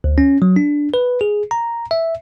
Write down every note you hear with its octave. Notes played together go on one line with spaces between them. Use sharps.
D2
C#4
F#3
D4
B4
G#4
A#5
E5